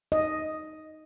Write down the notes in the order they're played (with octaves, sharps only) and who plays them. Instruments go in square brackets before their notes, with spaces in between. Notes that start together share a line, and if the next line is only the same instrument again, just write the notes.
[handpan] D#5